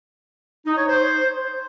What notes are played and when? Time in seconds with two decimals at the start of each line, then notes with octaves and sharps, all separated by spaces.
0.66 D#4
0.77 C#5
0.88 C5